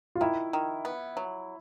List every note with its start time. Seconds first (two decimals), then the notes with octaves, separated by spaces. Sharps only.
0.15 F4
0.21 D#3 E4
0.53 D#3
0.85 B3
1.17 F#3